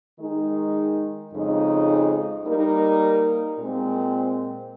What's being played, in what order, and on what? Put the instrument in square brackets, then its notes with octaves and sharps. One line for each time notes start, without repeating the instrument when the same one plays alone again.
[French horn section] D#3 G#3 D#4
F2 C#3 G#3 D#4
G3 A#3 D#4 A#4
A#2 G#3 C4